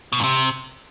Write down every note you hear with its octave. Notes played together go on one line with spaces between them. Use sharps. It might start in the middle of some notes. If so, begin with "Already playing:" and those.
B2
G#2
C3